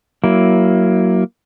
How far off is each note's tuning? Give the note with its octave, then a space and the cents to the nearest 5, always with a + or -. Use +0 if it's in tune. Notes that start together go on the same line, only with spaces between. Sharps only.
F#3 +15 A#3 +5 E4 +0